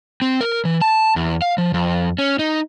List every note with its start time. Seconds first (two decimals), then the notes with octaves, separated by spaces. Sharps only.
0.22 C4
0.41 A#4
0.65 E3
0.81 A5
1.16 E2
1.42 F5
1.58 F3
1.74 F2
2.19 C#4
2.39 D#4